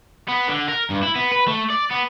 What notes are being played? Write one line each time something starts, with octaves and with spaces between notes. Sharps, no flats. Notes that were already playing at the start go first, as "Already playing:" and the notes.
B3
D3
A#4
G2
E4
B3
B4
A3
D5
B3